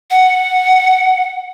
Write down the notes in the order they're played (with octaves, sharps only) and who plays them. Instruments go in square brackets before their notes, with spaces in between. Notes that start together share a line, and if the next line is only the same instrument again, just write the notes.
[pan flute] F#5